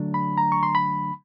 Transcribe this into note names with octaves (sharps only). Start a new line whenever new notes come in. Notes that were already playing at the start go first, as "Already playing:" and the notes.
Already playing: D3 F#3 A3 D4
B5
A#5
C#6
C6
B5